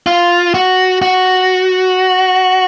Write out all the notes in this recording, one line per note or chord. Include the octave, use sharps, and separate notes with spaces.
F4
F#4
F#4